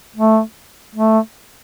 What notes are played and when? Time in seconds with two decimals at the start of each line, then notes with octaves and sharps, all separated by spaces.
0.16 A3
0.95 A3